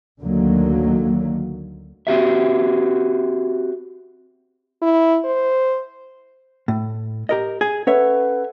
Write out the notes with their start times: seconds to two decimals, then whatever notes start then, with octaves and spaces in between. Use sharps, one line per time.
0.21 D2 D3 D#3 F#3 A#3
2.07 C4 F#4 G4 E5
4.82 E4
5.25 C5
6.68 A2
7.29 G4 A#4 D#5
7.61 G#4
7.87 C#4 A4 B4 C#5 E5 F#5